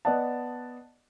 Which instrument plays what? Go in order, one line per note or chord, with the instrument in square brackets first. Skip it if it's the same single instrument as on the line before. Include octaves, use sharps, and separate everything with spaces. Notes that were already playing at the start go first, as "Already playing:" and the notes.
[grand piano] B3 D5 D#5 F#5 A5